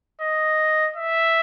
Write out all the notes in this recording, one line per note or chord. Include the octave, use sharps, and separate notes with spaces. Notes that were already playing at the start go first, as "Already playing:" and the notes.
D#5
E5